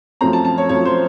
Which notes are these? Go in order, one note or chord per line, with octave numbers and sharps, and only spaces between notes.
F#2 F3 A3 C4 A#5
A5
A5
C#5
F#2 F3 A3 C4 C#5
C5